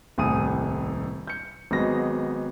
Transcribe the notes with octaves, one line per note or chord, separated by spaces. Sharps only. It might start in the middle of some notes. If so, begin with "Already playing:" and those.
D#1 C2 A2 G#5 D#6 D#7
G6 C#7
G#1 F#3 G#3 B3 A#6